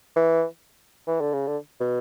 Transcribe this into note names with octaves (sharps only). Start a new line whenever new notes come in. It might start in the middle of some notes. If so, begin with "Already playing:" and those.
E3
E3
D3
C#3
D3
B2